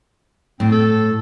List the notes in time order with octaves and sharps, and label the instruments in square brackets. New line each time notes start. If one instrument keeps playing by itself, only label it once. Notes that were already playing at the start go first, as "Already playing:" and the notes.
[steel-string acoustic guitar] A2 [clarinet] C4
[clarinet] A4